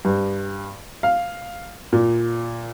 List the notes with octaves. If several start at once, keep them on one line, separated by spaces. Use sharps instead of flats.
G2
F5
A#2